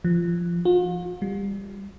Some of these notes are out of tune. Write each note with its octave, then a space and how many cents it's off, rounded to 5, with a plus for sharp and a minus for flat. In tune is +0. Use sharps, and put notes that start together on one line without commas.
F3 -20
F4 +45
G3 +25